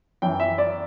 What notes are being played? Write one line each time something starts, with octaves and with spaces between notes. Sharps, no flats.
F#2 E3 G5
E5
D5